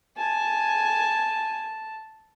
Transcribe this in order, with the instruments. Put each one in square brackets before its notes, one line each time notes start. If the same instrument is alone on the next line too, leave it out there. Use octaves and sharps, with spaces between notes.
[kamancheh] G#5 [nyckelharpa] A5